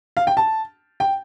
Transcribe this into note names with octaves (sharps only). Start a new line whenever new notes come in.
F5
G5
A5
G5